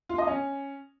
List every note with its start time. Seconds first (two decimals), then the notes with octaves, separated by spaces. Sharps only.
0.09 F4
0.18 D#5
0.27 C#4